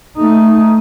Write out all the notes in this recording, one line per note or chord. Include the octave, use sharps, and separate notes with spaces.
A3 D#4